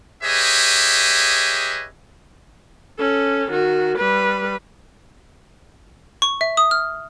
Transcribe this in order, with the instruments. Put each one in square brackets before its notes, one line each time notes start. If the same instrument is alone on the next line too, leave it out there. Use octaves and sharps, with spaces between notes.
[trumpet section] G4 G#4 B4 C#5 D#5 E5
[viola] C#4 A4
D#3 F#4
G3 B4
[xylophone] C#6
E5
D#6
F6